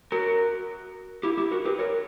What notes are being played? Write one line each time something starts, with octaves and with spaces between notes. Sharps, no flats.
F#4 A#4
E4 G4
E4 G4
F#4 A#4
G4 B4
A#4 C#5